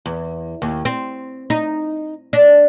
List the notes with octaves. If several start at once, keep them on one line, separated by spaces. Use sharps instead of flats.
E2
D#2
C4
D#4
D4